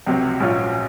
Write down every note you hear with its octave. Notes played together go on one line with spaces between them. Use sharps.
C#2 C3 F#3 C4
A#1 G#2 F#3 C#4 F4